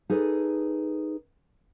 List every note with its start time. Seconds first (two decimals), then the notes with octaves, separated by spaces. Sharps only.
0.10 D#4 G#4 A4 B4